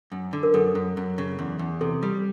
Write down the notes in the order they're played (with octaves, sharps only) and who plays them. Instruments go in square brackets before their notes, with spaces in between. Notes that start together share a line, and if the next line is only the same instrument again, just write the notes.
[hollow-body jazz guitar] F#2
D3
[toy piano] A#4
[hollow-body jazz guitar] F#2 [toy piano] A4
[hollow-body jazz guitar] F#2
F#2
C#3
E2
E2
[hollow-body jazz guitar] C3 [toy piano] A4
[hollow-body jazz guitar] G3